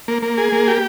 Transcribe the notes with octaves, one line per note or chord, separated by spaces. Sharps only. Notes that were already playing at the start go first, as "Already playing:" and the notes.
A#3
A#3
G#4
A#3
G4